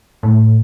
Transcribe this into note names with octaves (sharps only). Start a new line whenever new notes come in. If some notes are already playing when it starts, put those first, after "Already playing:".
A2